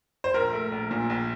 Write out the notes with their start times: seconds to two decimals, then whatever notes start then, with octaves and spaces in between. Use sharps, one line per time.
0.24 C5
0.34 A#1 A#4
0.53 A3
0.72 A#1
0.91 A#2
1.10 A#1